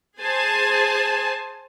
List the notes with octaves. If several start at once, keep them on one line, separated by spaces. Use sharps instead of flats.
G#4 C5 G#5 A5